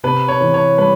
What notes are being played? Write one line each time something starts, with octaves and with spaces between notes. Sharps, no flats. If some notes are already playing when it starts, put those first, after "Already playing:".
C3 B4
C#5
E3
C#5
G3 B4